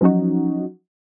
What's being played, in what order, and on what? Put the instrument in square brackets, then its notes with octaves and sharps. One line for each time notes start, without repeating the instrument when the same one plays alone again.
[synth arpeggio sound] F3 F#3 C#4 D#4 F#4